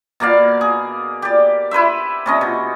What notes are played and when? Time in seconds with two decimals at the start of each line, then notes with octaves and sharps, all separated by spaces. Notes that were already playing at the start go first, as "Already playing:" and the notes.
0.20 B2 A#3 D5 F5
0.61 G#4
1.22 G4 D5
1.71 E4 B4 C5 E5
2.26 C3 C#4 D#5
2.41 B2